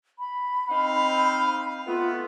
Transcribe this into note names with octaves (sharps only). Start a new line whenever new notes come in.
B5
C4 D#4 F5
A3 B3 F4